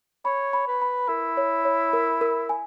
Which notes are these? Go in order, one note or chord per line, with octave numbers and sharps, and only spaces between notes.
C#5 B5
B5
B4
B5
E4 A#4
C#5
C#5
A#4
A#4
G#5